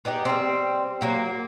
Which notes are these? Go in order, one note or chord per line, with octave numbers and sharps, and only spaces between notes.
B3 D#4 G4 G#4
G3 C4
F#3 A#3 F#4